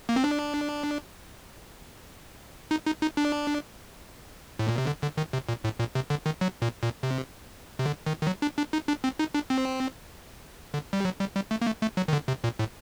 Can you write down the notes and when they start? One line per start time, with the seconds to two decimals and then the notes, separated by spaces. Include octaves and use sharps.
0.09 A#3
0.16 C4
0.24 D4
2.71 D#4
2.86 D#4
3.02 D#4
3.17 D4
4.59 A2
4.68 A#2
4.78 C3
4.87 D3
5.03 D3
5.17 D#3
5.33 C3
5.49 A#2
5.64 A2
5.79 A#2
5.95 C3
6.10 D3
6.26 D#3
6.41 F#3
6.62 A#2
6.83 A#2
7.03 C3
7.79 C3
7.86 D3
8.06 D#3
8.22 D#3
8.27 F#3
8.42 D4
8.58 D4
8.73 D#4
8.88 D4
9.04 C4
9.19 D#4
9.34 D4
9.50 C4
10.74 D3
10.93 G3
11.05 F#3
11.20 G3
11.35 G3
11.51 A3
11.62 A#3
11.66 A3
11.82 A3
11.97 F#3
12.08 D#3
12.13 D3
12.28 C3
12.44 A#2
12.59 A2